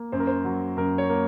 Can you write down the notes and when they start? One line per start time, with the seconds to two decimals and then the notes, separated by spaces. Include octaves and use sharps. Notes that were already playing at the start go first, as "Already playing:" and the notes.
Already playing: A#3
0.12 F#2 C5
0.20 A#4
0.27 C5
0.45 F#3
0.77 F#2 A#4
0.98 C#5
1.09 A#3